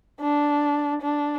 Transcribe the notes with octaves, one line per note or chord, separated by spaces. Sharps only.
D4
D4